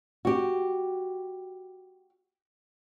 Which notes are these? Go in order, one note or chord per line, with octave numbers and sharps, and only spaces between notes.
F#4 G4